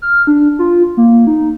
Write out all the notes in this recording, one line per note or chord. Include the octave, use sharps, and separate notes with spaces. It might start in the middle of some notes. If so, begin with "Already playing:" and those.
F6
D4
F4
A#3
D#4